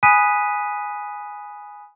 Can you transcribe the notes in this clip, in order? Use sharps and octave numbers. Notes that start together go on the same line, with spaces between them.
G#5 B5 D#6 F#6 B6 D#7